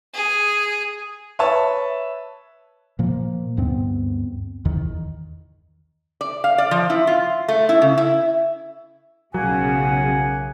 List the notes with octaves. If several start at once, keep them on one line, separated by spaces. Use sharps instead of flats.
G#4
B4 C#5 E5 A5
A#2 F3 A#3
D2 G2 B3 C4
E2 D#3
D5
F5
D5
F3
E4
F4
A3
E4
C#3
E4
B1 C#3 F#3 A#3 F#5 G#5